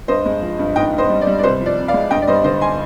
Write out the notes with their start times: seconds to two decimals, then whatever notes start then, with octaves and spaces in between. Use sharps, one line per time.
0.08 G2 C5 D#5
0.26 G#3
0.42 F3
0.59 G2
0.76 G#2 D#5 G5
0.93 G#2
0.98 C5 D#5
1.10 G3
1.21 D5
1.27 G3
1.39 D5
1.43 C2 C5
1.60 F3
1.66 D5
1.76 C3
1.88 D5 F5
1.94 G#3
2.11 G2 D#5 G5
2.22 D5
2.27 G3 C5 D#5
2.44 D3 C5 D#5
2.61 G#5 C6